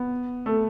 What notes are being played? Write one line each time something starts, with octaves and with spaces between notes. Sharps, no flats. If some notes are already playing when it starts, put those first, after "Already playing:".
Already playing: B3
A3